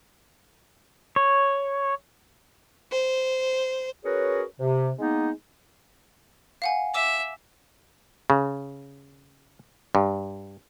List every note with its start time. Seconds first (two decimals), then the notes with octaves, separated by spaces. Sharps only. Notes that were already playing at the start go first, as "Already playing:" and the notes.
1.16 C#5
2.92 C5
4.05 C#4 F#4 G#4 A#4 B4 C#5
4.60 C3
4.99 G#3 A#3 B3 D#4
6.62 F5 F#5 G#5
6.94 E5 D6 E6 E7
8.30 C#3
9.95 G2